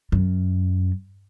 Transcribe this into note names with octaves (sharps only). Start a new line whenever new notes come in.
F#2